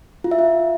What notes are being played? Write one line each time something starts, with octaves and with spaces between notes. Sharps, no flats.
F4
E5
F4